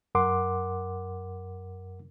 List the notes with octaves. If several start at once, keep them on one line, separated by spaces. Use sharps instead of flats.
F#2 A#4 F#5 C6 D6